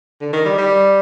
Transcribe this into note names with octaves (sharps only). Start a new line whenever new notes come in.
D3
D#3
G3
G3